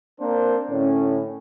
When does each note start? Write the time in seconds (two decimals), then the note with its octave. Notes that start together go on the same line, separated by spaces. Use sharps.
0.19 A#3 C4 D4 A#4 C5
0.70 A2 D3 C#4